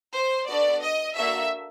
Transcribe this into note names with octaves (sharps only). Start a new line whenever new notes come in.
C5
B3 D4 F#4 A4 D5
D#5
A#3 D4 F#4 A4 E5